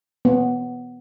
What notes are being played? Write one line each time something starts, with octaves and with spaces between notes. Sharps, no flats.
B3